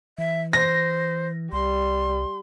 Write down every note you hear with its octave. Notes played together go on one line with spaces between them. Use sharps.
E3 E5
C5 A#6
C2 G3 C6